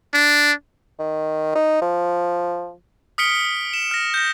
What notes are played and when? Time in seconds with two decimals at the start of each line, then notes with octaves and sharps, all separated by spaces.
0.14 D4
0.99 D#3
1.55 D#4
1.81 F3
3.18 D#6 F6 B6 C#7 D7 G7
3.74 E7
3.91 F6 A#6
4.14 G6 A#6